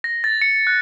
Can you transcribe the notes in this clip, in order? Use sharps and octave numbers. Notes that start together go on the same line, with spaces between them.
A#6
A6
C#7
F#6